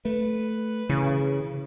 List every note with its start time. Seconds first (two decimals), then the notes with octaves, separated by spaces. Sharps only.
0.05 A3 B4
0.89 C#3 E3